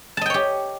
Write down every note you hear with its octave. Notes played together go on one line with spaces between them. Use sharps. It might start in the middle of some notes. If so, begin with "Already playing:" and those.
G4 C#5 D#5 G5 A5